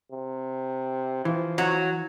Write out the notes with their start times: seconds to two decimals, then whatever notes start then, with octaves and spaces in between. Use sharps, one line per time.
0.12 C3
1.25 E3 F3
1.58 F#3